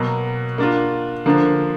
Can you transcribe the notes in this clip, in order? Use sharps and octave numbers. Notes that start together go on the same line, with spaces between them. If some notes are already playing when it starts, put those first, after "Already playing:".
Already playing: B2 F#3 A#3
A#3 D4 F4
D3 F3 A#3 D4